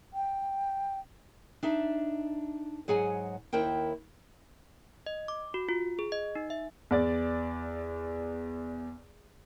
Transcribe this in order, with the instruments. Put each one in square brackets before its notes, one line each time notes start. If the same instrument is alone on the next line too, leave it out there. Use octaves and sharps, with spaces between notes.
[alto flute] G5
[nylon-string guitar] D4 D#4 E5
G#2 F#3 G#4 F#5 G#5
D#2 E4 A#4 C5 G5
[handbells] D#5
D6
F#4
F4
G#4
D#5
D#4
E5
[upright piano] E2 D5 A6